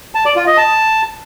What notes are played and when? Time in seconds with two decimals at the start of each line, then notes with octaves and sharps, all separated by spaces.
0.15 A5
0.25 D5
0.36 F4
0.47 D#5
0.57 A5